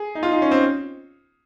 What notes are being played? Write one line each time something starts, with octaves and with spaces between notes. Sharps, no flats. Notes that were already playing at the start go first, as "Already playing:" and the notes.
Already playing: G#4
D#4
F4
D#4
C#4
C4